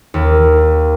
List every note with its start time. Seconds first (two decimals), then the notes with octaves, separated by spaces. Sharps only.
0.14 D#2